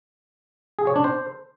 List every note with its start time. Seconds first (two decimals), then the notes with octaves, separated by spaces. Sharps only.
0.79 G#4
0.87 C#5
0.96 D4
1.04 C5